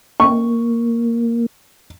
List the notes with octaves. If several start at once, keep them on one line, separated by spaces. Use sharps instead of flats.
A#3 C#6